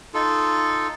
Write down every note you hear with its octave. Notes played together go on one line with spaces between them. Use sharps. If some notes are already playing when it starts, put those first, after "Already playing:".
D#4 F4 A4